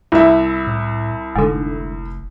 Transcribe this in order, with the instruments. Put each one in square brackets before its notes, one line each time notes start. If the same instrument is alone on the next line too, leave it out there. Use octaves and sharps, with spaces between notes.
[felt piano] C2 E5 [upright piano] E4
[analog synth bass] A2
[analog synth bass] F1 [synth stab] G#2 D3